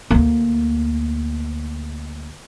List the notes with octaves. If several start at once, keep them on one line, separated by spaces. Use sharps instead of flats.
D2 A#3